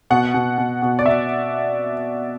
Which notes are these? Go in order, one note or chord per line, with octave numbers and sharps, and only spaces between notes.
B2 F#5
B2
B2
B2
D5
B2 E5